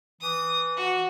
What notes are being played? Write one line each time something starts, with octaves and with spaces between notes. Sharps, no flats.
E3 D#6
F#4